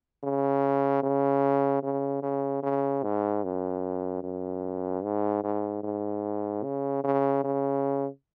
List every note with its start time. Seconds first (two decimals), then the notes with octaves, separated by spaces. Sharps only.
0.23 C#3
1.03 C#3
1.83 C#3
2.22 C#3
2.63 C#3
3.03 G#2
3.44 F#2
4.23 F#2
5.04 G#2
5.44 G#2
5.83 G#2
6.64 C#3
7.04 C#3
7.44 C#3